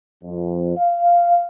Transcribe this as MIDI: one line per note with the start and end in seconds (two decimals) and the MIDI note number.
0.24 0.77 41
0.77 1.48 77